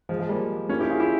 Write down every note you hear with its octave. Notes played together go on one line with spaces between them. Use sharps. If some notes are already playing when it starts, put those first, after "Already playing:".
F3 G#3
F3 G#3
G3 A#3
A#3 C#4
E4 G4
F4 G#4
E4 G4